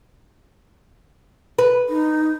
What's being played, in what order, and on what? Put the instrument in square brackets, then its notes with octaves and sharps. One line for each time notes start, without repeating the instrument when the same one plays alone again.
[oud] B4
[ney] D#4